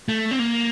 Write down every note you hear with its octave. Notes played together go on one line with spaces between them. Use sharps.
A3
C4
A#3